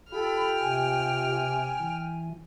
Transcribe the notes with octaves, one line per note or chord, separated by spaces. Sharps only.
F4 G4 A4 G5 B5 F6
C3 G#5
E3